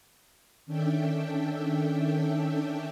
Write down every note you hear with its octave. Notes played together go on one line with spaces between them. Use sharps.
D#3 C#4 D4 A4 E5 G5